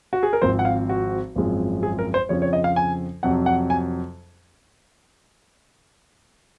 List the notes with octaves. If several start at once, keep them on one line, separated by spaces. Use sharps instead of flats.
F#4
G#4
A#4
G#1 G#2 F3 C4 C5
F#5
F5
F#4
G#1 F#2 F3 G#3 C4
G#4
A#4
C5
F2 C#3 F3 C4 C#5
C#5
D#5
F5
G#5
F2 C3 F#3 C4 F#5
F#5
G#5